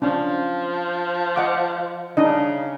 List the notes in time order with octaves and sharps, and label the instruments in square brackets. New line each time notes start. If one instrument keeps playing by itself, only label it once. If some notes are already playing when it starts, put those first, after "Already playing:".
[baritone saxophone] F3 [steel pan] C#4 D4
[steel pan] D#5 F#5 D6
[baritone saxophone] C#3 [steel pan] D4 D#4 D#5